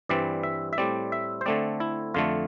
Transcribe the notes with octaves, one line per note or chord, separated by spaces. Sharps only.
G2 E3 G3 C4 D5
E5
E5
A2 G3 C4 D5
E5
C5
D3 A3 C4 D5
E4
F2 D3 A3 F4